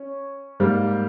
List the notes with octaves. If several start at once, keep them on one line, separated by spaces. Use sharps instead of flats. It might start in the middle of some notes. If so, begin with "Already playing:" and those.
Already playing: C#4
G#2 G3 A#3